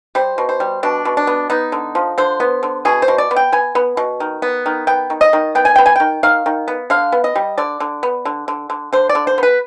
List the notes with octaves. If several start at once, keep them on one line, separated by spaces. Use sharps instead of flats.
G3 C5
B2
C5
G3
B2 D4
B2
D4
B3
B3 D#4
D3
F3
D3 C5
B3
D3
B2 G#4
C5
B2
D5
B3
G5
B3 G#5
B3
B2
D#3
B3
D#3
B3 G5
D#3
D#5
D#3
B3 G5
G#5
B3 G5
G#5
D#3 G5
D#3 F5
D#3
B3
D3 F5
B3
D#5
G3
D3 D5
D3
B3
D3
D3
D3
D3 C5
D5
D3
C5
B3 B4